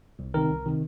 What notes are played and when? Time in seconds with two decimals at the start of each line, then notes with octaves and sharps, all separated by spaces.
0.19 C2
0.34 C3 D#3 A#4
0.50 C2
0.66 C3 D#3